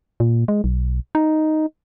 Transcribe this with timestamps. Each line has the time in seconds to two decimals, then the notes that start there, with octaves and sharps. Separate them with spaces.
0.20 A#2
0.48 G#3
0.64 B1
1.15 D#4